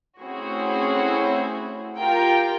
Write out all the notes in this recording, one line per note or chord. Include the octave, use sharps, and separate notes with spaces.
A3 C4 C#4 E4 F#4 G#4
F4 G4 A#4 G5